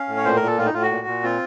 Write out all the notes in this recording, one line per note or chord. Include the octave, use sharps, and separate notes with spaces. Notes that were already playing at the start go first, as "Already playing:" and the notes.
Already playing: C#4 F5
A2
C#5
A#2 C5
A#4
A#2
A4
A2 F4
D#4
A2 F4
F#4
A#2
A#2
C4 F4